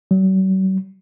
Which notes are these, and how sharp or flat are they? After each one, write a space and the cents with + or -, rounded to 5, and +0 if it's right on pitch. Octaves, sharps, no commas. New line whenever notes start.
F#3 +45